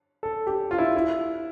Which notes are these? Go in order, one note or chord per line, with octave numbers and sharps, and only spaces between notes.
A4
G4
F4
E4
E4